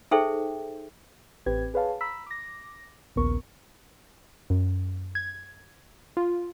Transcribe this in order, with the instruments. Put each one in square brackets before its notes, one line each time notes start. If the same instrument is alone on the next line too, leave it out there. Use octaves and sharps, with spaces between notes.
[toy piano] D#4 G#4 A4 C5 E5 G5
[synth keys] A1 C4 G4 B4 G#6
G#4 B4 C#5 F5 A5
A#5 B5 E6 B6
D6 A#6
A#1 D#2 C#3 B3 A#4 C#6
[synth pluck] F#2
G#6
F4